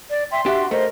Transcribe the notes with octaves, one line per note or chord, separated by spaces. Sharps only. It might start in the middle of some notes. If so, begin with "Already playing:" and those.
D5
E5 G5 C6
D4 F#4 G4 E5
A3 A#4 C5 D#5